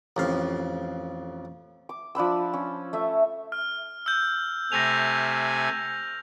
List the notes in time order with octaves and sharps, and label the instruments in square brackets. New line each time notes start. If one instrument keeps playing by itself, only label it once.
[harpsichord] A1 F2 F5
[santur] D6
F3 D4 B5 E6
C#4
A3 E5
[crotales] F6
E6 G6
[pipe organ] C3 A3 G#5 [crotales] A#6 F7